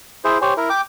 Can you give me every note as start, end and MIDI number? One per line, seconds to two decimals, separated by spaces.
0.25 0.38 64
0.25 0.38 68
0.25 0.38 72
0.42 0.54 67
0.42 0.54 72
0.42 0.54 73
0.42 0.54 80
0.57 0.69 64
0.57 0.69 70
0.70 0.81 79
0.70 0.81 86